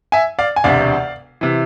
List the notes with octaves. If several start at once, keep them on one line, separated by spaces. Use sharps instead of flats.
E5 G#5
D5 F5
G#5
E1 D2 C3 D5 F5
C3 E3